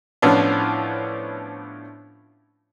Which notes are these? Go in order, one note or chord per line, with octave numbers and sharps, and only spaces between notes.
A2 F3 B3 C#4 D4